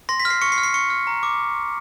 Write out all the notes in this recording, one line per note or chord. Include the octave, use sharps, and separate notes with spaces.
C6 A#6
B6
F6
C7
C#6 C#7
C7
F6
C7
C#6 C#7
F6
A#5
D6